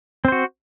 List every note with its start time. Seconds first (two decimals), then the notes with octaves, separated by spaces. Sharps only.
0.25 C4
0.28 C5
0.32 F#4